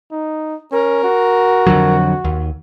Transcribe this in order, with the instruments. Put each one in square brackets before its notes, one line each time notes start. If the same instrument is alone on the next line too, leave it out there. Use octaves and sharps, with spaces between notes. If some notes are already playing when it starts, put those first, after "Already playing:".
[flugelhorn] D#4
[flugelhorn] C#4 [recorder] A#4
[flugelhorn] F#4
[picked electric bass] F2 D3 F#3
D#2